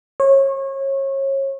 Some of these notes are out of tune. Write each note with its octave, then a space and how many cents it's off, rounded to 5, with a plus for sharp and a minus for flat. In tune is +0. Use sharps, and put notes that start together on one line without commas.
C#5 -30